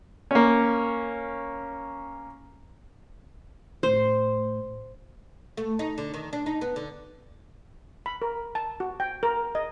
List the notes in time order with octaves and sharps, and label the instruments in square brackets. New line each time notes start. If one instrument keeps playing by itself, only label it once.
[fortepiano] A#3 C#4
[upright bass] A2 [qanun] C5
[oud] A3
D#4
D3
D#3
D4
D#4
B3
D3
[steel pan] B5
A#4
A5
F#4
G5
A#4
D#5